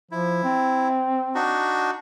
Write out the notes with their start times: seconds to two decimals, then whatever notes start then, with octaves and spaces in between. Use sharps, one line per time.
0.11 F3 E4
0.44 C4
1.35 D4 D#4 F#4